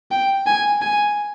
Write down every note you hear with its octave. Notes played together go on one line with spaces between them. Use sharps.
G5
G#5
G#5